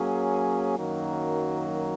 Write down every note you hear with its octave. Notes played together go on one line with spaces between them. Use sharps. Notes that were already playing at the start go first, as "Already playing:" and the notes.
Already playing: F#3 A#3 C#4 G#4
F#2 D#3 F#3 A#3